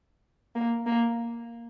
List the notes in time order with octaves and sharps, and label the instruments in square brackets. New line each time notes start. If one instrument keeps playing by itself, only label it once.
[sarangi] A#3
A#3